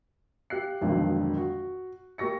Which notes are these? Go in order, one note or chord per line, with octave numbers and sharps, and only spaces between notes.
G4 F5 F#6 C7
G#1 F2 B2 D3 D#3 F#3
F#4
A#3 G4 C#6 A#6 C#7